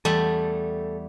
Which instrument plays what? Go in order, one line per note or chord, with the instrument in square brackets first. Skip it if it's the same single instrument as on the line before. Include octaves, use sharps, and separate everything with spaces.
[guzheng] E2 G3 A3 [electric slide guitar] A4